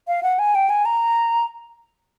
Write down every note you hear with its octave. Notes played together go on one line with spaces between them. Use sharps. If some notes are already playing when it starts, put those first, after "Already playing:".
F5
F#5
G#5
G5
G#5
A#5